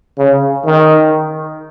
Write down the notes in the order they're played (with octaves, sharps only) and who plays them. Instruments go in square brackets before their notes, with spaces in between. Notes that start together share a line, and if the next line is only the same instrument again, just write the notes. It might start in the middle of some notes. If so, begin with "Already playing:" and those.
[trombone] C#3
D#3